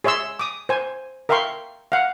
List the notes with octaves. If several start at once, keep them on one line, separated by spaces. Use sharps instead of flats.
G#4 C#5 E5 C6 E6
D6 D#6
C5 G#5
A#4 E5 F5 G5 C6 C#6
F5 F#5